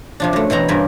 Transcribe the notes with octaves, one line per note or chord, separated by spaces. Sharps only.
C3 F3 D4
F#2 A3
B2 E3 C4 A#5
G2 C#3 A#4 C5 G#5 B5